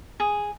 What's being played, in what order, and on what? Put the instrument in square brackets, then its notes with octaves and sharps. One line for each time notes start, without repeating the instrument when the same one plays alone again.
[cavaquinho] G#4